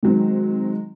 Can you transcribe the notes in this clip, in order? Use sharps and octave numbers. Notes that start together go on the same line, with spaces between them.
D#3 F#3 G#3 C4